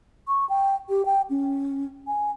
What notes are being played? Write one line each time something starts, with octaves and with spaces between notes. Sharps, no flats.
C#6
G5
G4
G5
C#4
G#5